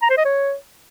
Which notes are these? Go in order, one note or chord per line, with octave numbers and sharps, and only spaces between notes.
A#5
C5
D#5
C#5